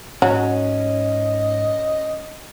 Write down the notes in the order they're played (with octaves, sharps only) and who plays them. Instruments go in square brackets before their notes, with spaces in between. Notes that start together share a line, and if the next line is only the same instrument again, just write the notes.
[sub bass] G#2 [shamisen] F#3 [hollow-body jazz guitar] C#4 [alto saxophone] D#5